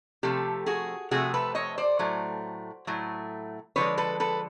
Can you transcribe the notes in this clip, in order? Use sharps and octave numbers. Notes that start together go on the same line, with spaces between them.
C3 F3 A3 G4 A4
F#4 G#4
C3 F3 A3 F#4 G#4
A4 B4
C#5 D#5
C5 D5
A2 F#3 A3
A2 F#3 A3
D3 F3 G#3 B4 C#5
A4 B4
A4 B4